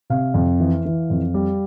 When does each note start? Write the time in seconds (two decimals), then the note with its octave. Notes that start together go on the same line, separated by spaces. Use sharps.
0.10 C3 F5
0.34 F2
0.60 E3
0.85 E3
1.10 F2
1.34 G3